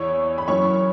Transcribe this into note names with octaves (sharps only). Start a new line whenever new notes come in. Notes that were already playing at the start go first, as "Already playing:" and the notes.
Already playing: E2 E3 C#5 C#6
B5
F#2 E3 C#5 C#6